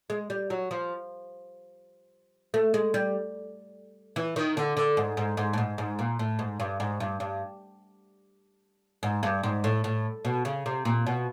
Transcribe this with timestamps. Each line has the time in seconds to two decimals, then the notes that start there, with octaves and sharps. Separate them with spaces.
0.10 G#3
0.30 G3
0.50 F#3
0.71 F3
2.54 A3
2.74 G#3
2.94 G3
4.16 E3
4.36 D#3
4.57 D3
4.77 D3
4.97 G#2
5.17 G#2
5.37 G#2
5.53 A2
5.58 G#2
5.78 G#2
5.99 A#2
6.19 A2
6.39 G#2
6.60 G2
6.80 G#2
7.00 G2
7.20 G2
9.03 G#2
9.23 G2
9.43 G#2
9.64 A2
9.84 A2
10.25 B2
10.45 C#3
10.66 C3
10.85 A#2
11.06 B2